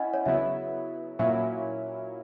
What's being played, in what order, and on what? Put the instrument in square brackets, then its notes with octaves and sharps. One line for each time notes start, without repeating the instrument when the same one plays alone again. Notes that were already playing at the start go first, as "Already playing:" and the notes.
Already playing: [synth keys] C#4 E4 [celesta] D#5 F#5 G#5
[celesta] C#5
[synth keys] C#3 F#3 B3 E4 [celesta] E5
[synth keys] A#2 F#3 C#4 E4 [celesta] E5